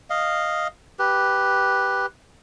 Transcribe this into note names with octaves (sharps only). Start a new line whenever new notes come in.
D#5 F5
G4 B4